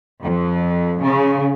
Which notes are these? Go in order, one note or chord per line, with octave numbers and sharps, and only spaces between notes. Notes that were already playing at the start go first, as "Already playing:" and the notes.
F2
C#3